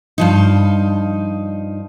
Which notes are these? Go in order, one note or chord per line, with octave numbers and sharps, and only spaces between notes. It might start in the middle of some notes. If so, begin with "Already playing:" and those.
G2 F3 D#4